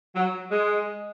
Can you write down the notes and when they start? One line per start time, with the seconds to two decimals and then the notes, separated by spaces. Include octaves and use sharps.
0.15 F#3
0.50 G#3